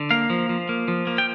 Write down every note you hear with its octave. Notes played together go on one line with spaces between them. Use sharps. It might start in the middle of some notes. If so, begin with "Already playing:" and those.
Already playing: D3
A#3 F5
F3
F3
A#3
F3
A#3
G5